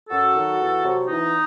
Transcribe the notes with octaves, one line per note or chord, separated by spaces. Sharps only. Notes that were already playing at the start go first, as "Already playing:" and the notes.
F#2 F#4 A4
D#3 F#3
E2
C3 F#3
E2 D#4